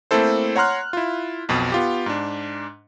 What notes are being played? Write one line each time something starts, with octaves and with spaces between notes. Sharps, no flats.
A3 A#3 C4 E4 A4 C5
C#5 F#5 A#5 C6 F6 F#6
E4 F4
B1 F2 B2
B3 F4 G4
G#2 D4